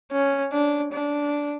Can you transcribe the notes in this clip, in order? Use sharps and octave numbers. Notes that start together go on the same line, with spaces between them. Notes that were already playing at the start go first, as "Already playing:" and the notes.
C#4
D4
D4